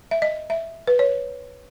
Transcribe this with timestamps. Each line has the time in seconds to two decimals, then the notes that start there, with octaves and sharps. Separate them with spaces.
0.11 E5
0.22 D#5
0.50 E5
0.87 B4
0.99 C#5